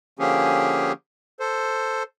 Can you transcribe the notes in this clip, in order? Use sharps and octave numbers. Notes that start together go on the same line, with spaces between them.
D3 F3 A#3 C#4 G4 G#4
A4 C5